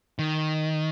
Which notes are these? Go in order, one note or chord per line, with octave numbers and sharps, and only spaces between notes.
D#3